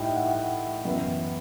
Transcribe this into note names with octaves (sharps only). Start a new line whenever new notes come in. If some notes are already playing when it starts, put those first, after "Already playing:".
Already playing: A2 G3 D#4 D#5 E5 G5
F#5
F#2 E3 B3 E4